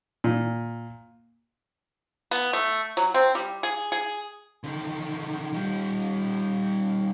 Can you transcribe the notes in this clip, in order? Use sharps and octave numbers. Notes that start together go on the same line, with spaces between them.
A#2
B3
A3
F#3
C4
G3
G#4
G#4
D3 D#3
D#3 G3